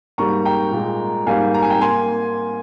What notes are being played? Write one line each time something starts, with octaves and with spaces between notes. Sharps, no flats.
G#2 G3 A#3 A#5 C#6
G5 A#5
A#2 G#3
G#2 G3 A#3 F5 G#5
A#5
G#5
G5 A#5
A#3 G#5 C6